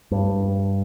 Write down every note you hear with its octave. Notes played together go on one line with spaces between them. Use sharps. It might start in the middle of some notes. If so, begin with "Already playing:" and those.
G2